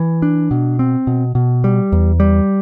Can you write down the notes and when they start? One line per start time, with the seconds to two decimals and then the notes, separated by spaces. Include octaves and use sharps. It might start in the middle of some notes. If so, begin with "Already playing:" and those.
Already playing: E3
0.22 D4
0.51 B2
0.79 C4
1.07 B2
1.35 B2
1.64 G3
1.92 E2
2.20 G3